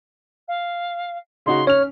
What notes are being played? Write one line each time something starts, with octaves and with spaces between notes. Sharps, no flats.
F5
C#3 D#4 F#4 C6
C#4 C#5 F6 F7